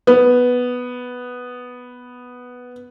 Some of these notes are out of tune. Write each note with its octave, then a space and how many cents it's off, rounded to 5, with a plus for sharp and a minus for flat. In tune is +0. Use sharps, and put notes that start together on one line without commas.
B3 +0